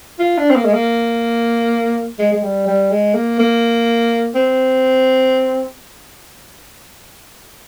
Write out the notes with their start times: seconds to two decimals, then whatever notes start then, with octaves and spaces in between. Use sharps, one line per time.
0.19 F4
0.37 D4
0.50 C4
0.56 A#3
0.65 G#3
0.73 A#3
2.19 G#3
2.32 G#3
2.43 G3
2.67 G3
2.90 G#3
3.14 A#3
3.39 A#3
4.35 C4